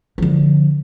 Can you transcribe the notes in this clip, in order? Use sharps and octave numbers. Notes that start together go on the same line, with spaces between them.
D3 F3